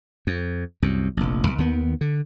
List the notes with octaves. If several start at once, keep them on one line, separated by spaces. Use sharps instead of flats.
F2
C2 F#2
F1 A#1
B1
D#2 D#3 B3
D3